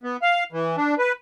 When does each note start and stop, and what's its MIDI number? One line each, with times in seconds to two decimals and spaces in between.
0.03 0.17 59
0.22 0.44 77
0.52 0.76 52
0.77 0.94 62
0.98 1.12 71